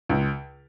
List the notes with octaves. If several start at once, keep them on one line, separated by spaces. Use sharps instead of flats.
C#2